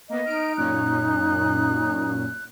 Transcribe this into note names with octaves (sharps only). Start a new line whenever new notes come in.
A#3 B3 D#5
D#4 F6 D7
F#2 A#2 C#4 F#6